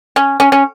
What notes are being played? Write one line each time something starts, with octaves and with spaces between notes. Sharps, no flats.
C#4
C#4
C#4